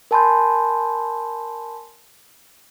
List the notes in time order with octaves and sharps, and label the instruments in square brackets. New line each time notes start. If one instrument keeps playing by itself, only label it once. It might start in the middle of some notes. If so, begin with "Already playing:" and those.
[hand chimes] A#4 G#5 A5 B5 C6 G6